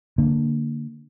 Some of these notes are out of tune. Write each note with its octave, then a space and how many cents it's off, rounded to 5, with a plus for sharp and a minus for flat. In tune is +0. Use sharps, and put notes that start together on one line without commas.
D3 +0 A#3 -15